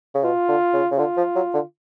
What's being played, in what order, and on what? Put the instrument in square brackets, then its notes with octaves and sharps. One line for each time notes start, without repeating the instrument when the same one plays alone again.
[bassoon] C#3
[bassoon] B2 [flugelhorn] F4
[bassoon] D3
C#3
C#3
[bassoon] D3 [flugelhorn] F4
[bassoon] F3
F#3
D3